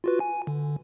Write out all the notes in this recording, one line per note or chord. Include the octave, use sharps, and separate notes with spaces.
F4 F#4 B4
G#5
D3